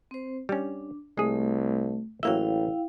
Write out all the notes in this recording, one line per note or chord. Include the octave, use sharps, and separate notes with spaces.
C4 C5
G3 C#4 D4
C2 G#3 A3 G#4
A1 F#3 A#3 E4 E5 F5 G5